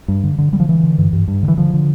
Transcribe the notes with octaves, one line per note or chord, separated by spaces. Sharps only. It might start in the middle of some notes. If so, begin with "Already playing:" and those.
G2
D3
D3
D3 G3
F3
D3 E3
D3
G2
G2
G2
D3
E3
D3 F3
D3